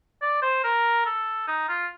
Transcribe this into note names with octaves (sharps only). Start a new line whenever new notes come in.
D5
C5
A#4
A4
D#4
F4